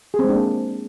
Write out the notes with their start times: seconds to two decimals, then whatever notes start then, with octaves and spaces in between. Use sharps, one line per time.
0.14 G#4
0.19 C4
0.24 G#3
0.29 D4
0.34 A#3